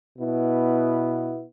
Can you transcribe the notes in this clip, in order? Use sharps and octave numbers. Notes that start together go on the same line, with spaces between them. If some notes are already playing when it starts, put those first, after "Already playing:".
B2 B3 E4